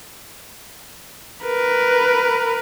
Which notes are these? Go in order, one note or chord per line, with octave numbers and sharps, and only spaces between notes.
A#4 B4